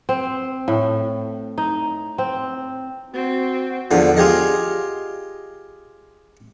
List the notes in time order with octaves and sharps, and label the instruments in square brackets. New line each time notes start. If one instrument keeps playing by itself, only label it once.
[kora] C4
A2
D#4
C4
[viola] C4 [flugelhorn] F#4
[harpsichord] E2 D3 F3
F4 G4 G#4 D#5